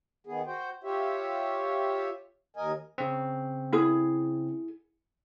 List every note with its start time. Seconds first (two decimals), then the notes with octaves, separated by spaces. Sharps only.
0.27 D#3 B3 G#4
0.46 F#4 C5 G5
0.84 F4 G4 C#5 E5
2.57 D#2 A#4 D#5 G#5
2.98 C#3 C4
3.73 E4 G#4